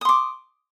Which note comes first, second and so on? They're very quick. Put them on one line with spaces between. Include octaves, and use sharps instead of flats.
D#6 C6 D6